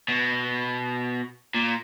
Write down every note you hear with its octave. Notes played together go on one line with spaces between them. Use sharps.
B2
A#2